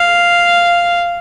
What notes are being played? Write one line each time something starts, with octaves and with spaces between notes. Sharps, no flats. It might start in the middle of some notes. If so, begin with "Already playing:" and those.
Already playing: F5